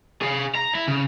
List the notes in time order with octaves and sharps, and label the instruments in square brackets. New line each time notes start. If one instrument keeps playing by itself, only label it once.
[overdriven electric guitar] G#4 F5
A#5
E4
C#3